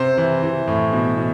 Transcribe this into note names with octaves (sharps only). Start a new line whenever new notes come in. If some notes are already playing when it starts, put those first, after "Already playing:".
Already playing: C3 C5
E3
E3
A2
B2
B2